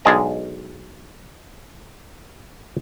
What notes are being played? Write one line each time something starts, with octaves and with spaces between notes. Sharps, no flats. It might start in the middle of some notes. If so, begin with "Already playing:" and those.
B1 G#3 D4 G#4 D#5 A#5